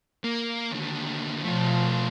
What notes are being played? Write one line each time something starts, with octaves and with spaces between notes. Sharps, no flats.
A#3
D#2 D3
B2 F3 A3 F4